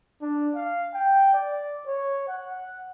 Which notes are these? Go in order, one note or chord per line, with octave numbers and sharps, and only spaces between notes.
D4
F5
G5
D5
C#5
F#5